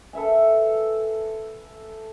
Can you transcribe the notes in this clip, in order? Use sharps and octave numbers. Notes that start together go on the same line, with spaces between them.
A4 B4 E5 G#5